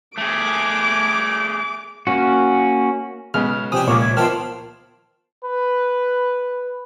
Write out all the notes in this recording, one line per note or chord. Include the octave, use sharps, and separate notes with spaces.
A3 G#4 D6
A#3 C#4 F#4
B1 C#3 G#3 B3 F6
C3 F3 D4 G4 G#5 D#6
C#2 A#2 A#4 C#5 D6
E5 G#6
D#3 F3 B3 F4 G5 A5 F6
B4